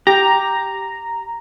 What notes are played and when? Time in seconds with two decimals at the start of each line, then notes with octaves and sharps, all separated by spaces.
0.07 G4 A#5